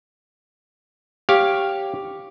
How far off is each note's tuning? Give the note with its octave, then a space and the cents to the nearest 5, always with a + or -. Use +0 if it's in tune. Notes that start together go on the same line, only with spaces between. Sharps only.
G4 +0 C#5 -10 F5 +0